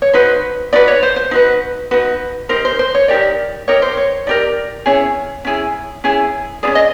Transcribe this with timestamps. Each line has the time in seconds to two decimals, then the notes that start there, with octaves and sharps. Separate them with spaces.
0.02 C#5
0.13 D#4 F#4 B4 C5
0.73 D#4 F#4 B4 D5
0.88 C#5
1.03 C5
1.16 C5
1.31 D#4 F#4 B4
1.91 D#4 F#4 B4
2.49 D#4 G4 A#4 C5
2.65 C5
2.79 C5
2.95 C#5
3.08 D#4 G4 A#4 D5
3.68 D#4 G4 A#4 C#5
3.82 C5
3.97 C#5
4.27 D#4 G4 A#4 D5
4.86 C#4 E4 G#4 C#5
5.45 C#4 E4 G#4
6.04 C#4 E4 G#4
6.63 E4 G#4 D5
6.67 C#4
6.75 D#5